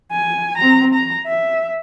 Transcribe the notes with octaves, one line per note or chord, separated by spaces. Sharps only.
G#5
C4 A#5
A#5
E5